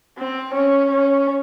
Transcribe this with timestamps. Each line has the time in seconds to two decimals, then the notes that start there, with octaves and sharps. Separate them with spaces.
0.18 C4
0.55 C#4
0.91 C#4